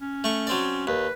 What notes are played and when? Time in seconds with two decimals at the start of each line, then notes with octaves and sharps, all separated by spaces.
0.01 C#4
0.24 A3 C#6
0.47 F#3 C4 D5
0.87 D#2 B4